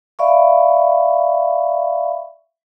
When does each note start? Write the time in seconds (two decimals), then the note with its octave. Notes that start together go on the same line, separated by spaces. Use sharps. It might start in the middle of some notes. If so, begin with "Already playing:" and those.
0.19 D5 E5 F5 B5 C#6